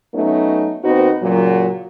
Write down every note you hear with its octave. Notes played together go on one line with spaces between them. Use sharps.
F#3 A3 B3 C#4 D#4
D#2 B3 C4 D#4 F#4
A#2 C#3 F#3